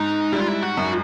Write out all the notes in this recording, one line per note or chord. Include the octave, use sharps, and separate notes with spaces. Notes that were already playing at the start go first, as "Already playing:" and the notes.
Already playing: G#2 D#4
G3 E4
F4
E4
F#4
F#2